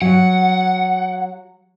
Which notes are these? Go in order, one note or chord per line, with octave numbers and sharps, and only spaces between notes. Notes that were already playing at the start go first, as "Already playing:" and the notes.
F#3 F#5